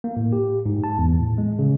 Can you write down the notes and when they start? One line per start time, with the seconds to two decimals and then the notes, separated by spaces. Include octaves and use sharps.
0.04 A#3
0.17 A2
0.33 G4
0.66 G#2
0.84 A5
0.98 E2
1.20 A2
1.38 G#3
1.59 C#3